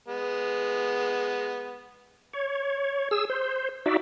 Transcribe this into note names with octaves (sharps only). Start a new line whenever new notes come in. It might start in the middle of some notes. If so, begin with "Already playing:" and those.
G#3 B3
C#5
G#4 E6
C5
D#4 F#4 D5 E5